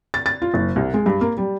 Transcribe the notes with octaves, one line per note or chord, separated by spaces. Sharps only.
A6
A6
F4
F#1
C2
G#3
G2
A#3
G3